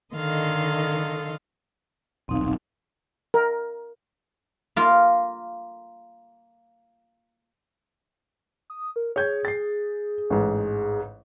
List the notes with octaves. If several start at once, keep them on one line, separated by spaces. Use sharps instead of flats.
D3 D#3 A4 D#5 F5 C6
D#1 B1 C4 D#4 F5
A#4
A#3 F4
D#6
A#4
G#4 C#5 G6 G#6
A6 C7
A1 G#2